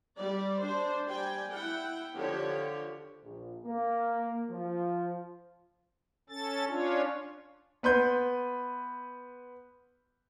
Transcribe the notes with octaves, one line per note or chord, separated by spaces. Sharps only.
G3 D5
D4 C5
G3 D5 G5 G#5
E4 F#5 G5
D3 F3 G4 C#5
A#1
A#3
F3
C#4 A4 A6
C#4 D4 F4 C#5
B3 B4 C6 G6